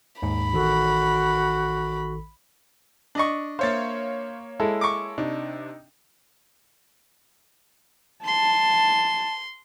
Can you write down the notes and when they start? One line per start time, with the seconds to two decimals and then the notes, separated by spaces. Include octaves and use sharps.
0.22 D#2 G#2 B5
0.53 A1 D#3 F#4 A4
3.15 D4 D#5 C#6
3.59 A#3 C5 C#5 E5 F5 A6
4.60 G#3 E4 A4
4.81 C#6 D6
5.18 C3 D4 D#4
8.25 A5 C6